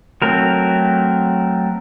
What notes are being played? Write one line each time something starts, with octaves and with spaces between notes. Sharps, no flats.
F#3 A3 C4 A#4